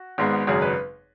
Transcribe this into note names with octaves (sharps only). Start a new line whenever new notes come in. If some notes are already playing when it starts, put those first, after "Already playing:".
Already playing: F#4
G#1 G#2 G#3 B3
G#1 F#2 C#3 G#4
B4